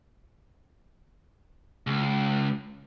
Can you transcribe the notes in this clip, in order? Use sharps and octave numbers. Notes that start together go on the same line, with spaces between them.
C#2